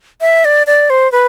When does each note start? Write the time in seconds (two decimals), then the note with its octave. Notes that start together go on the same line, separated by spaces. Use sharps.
0.21 E5
0.45 D5
0.67 D5
0.90 C5
1.12 B4